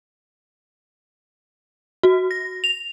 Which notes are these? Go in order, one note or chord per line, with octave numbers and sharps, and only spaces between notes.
F#4
A#6
F7